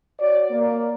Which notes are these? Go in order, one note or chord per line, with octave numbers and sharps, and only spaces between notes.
F#4 C#5 D5
A#3